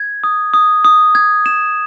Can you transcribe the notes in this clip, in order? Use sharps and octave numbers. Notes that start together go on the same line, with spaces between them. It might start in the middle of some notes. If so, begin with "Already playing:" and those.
Already playing: G#6
D#6
D#6
D#6
G#6
E7